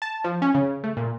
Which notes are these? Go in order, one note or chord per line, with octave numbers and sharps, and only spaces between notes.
A5
F3
C#4
C#3
A3
A#2